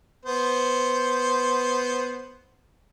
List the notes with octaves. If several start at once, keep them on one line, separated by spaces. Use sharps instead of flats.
B3 C5